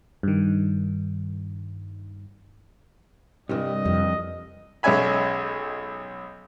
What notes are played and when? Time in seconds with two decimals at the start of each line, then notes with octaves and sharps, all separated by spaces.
0.23 G2 D#3
3.49 C2 G2 E3 G3 D#5
3.85 F2 G3
4.83 B1 G#3 C#4 E5 G#5 B5